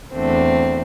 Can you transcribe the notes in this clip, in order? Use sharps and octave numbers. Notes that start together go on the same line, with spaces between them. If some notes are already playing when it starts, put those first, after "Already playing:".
E2 D3 A3 C4